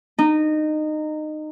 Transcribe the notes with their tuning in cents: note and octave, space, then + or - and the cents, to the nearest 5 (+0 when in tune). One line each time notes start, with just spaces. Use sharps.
D#4 -20